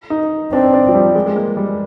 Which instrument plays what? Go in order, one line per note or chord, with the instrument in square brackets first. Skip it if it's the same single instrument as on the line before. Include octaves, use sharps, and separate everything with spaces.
[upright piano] D#4
[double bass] C4 [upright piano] D4
[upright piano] D4
F3
G3
G#3
G#3
A#3
G3